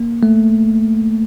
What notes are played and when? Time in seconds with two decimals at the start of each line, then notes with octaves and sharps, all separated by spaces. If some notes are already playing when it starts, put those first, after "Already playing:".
Already playing: A#3
0.23 A3